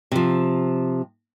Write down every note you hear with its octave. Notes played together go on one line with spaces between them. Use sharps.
C3 F3